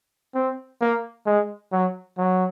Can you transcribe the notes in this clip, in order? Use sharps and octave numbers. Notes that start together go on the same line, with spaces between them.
C4
A#3
G#3
F#3
F#3